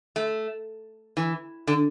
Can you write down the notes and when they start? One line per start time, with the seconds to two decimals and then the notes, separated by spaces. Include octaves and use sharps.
0.16 A3
1.17 E3
1.67 D3